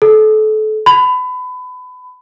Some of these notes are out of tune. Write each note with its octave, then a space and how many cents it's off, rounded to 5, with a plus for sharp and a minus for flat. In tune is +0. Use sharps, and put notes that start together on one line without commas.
A4 -30
B5 +25